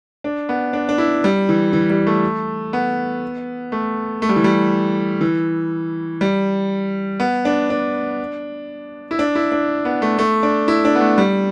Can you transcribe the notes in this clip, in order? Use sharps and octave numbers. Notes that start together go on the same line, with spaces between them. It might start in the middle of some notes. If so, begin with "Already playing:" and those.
D4
B3
D4
D4
E4
G3
E3
E3
G3
A3
B3
A3
A3
G3
E3
G3
E3
G3
B3
D4
D4
E4
D4
E4
D4
B3
A3
A3
D4
E4
D4
B3
A3
G3